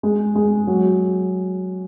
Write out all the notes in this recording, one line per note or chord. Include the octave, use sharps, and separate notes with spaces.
G#3
G#3
F#3